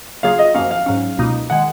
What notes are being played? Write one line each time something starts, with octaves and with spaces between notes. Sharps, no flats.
C#3 F#3 A#3 F4 G#4 F5
D#5
F#2 F3 A#3 C#4 F5
F5
G#2 F#3 C#4
C#2 B2 A#3 D#4
D#3 G#3 F#5